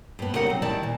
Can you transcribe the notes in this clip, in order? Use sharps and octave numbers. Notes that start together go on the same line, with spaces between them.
G2 B3
C#3 G3 D#4 A#4 F#5
F#3 C4
D#3 G3 E4 D5 A5
A#2